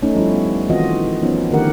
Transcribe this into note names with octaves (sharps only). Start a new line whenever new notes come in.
A3 C#4 D#4
F3 G3 C#4 E4
G3 B3
D#3 E3 C4 F4 F#4 D#5
F3 B3 C#4 D#4
D3 D#3 A3 G4 A#4 F#5